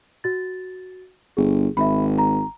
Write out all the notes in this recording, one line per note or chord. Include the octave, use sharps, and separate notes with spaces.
F#4 A6
G1 G#4
G#1 E5 B5
A#5